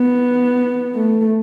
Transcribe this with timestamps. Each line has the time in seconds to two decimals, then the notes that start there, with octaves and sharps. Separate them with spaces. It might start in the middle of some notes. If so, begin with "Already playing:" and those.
Already playing: B3
0.95 A3